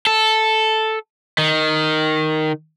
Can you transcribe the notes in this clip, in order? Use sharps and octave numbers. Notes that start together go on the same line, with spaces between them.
A4
D#3